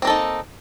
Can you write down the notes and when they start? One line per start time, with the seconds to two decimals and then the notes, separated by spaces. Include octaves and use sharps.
0.02 C4
0.05 A#3
0.07 A4
0.10 D#4